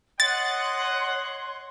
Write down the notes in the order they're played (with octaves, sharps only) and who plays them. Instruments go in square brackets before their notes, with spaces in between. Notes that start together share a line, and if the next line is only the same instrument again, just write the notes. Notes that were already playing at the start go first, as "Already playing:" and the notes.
[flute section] C#5 C6 [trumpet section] D#5 F#5 [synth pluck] A6